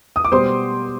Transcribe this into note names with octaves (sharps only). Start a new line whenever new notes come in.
D#6
D6
B2 G3 B3 C5 C6